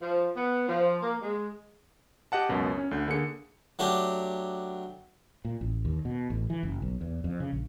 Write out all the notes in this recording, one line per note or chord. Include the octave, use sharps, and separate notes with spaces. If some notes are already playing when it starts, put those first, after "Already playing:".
F3
B3
F3
A#3
G#3
G4 D#5 F#5 A5
C#2 F#2 B2
C#4
D2 D3 G6
D3 A#3 G#4 C#7
F#3 A3 D4 G4
A#2
A1
D#2
B2
A1
E3
F#1
B1
E2
F2
C#3
A#1